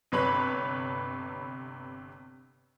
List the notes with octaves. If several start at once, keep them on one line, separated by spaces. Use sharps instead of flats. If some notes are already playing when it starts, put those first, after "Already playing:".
G1 C3 B4 C#5 B5